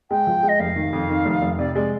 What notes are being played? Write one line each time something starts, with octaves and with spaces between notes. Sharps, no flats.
G#3 G5
F3
G#3
D#5
F1 F5
D#3
F2
D#3
F1
F1
C3 D5
G#3 D5